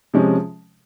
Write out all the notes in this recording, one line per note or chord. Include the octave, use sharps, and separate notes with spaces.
C3 F3 G#3 C#4